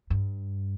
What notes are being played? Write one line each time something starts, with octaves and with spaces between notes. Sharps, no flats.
G2